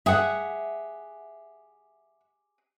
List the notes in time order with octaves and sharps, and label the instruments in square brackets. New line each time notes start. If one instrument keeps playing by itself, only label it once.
[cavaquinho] G4 G#4 D#6 [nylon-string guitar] E5 F#5